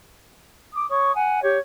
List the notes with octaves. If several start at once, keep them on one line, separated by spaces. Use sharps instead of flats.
D6 D#6
C#5 C#6 D#6
F#5 G#5
G4 C#5